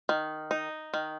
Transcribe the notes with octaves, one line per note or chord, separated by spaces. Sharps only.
D#3
D#4
D#3